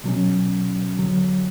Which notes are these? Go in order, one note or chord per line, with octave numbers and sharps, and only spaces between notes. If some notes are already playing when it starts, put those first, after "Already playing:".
B2 F#3 C#4
E2 D3 F#3